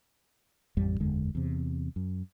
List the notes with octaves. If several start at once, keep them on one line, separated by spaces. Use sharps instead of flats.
A1 F2 G3
F#1 E2 D3 G#3
E2 C3
F#2